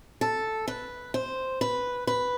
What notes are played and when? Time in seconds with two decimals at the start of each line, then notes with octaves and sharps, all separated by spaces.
0.21 A4
0.68 B4
1.14 C5
1.61 B4
2.07 B4